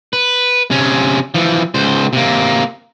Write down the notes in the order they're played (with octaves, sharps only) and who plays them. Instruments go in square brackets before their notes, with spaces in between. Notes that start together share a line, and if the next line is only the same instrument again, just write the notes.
[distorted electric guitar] B4
C3 C#4
E3 F3
C#2 C5
C3 A#3